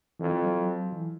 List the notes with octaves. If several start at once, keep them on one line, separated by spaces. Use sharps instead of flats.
F2 E3
F3
F#3
E3